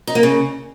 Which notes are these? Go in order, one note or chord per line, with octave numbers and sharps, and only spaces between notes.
D#4
A#3
C#3